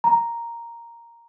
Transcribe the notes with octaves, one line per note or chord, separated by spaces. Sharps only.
A#5